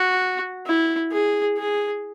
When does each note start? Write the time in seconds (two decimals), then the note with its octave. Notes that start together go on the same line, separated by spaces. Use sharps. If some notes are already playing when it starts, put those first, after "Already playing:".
Already playing: F#4
0.66 E4
1.12 G#4
1.57 G#4